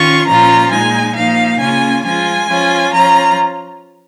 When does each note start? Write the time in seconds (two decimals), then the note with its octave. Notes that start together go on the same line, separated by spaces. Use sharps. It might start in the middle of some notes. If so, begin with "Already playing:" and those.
Already playing: D#3 C#4 F4 C#6
0.27 A#2 F3 A#3 C#4 F4 A#5
0.71 A#2 G#3 D#4 G#5
1.16 F3 A#3 D#4 F5
1.60 C#3 A#3 C#4 F4 G#5
2.04 F3 G#3 F4 G#5
2.49 F3 C#4 F4
2.93 F3 C#4 F4 A#5